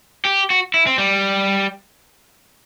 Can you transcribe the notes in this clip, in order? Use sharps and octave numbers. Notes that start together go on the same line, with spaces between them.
G4
F#4
E4
C4
G3